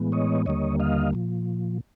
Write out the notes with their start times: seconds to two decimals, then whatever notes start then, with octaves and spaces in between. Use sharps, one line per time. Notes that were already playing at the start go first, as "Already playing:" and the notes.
Already playing: A2 E3 G#3 B3
0.12 C#5 D#5
0.46 D#2 D3 G3 A#3 C#5 D#5
0.80 D#5 F5
1.13 A#2 F3